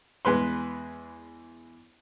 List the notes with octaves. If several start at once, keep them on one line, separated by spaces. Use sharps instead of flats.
E2 G#3 B4 C6